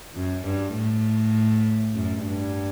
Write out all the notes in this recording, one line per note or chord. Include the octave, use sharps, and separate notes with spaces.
F#2
G2
A2
F#2
G2